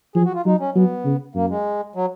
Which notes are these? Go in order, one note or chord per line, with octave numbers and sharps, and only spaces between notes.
F3 G#4
F#4
F4
F#3 D#4
C#4
F#3 B3
C#3
F#2 A#3
G#3
F#3